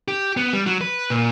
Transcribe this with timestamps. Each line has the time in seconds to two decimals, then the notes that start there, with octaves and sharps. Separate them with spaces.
0.08 G4
0.37 B3
0.53 G3
0.66 F#3
0.81 B4
1.10 A#2